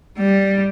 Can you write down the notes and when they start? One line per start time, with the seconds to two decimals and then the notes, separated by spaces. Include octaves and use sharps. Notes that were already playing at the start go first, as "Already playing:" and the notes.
0.18 G3